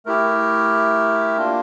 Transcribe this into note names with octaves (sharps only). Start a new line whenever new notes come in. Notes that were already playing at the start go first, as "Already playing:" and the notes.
A3 E4 G4 A#4
A#3 D4 F4